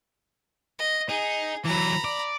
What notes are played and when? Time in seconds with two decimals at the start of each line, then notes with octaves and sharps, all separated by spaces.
0.79 D#5
1.09 D#4 G#4
1.65 E3 F#3 A#5 B5
2.04 D5